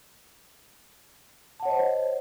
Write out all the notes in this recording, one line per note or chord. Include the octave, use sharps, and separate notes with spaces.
C5 C#5 D#5 F#5 A5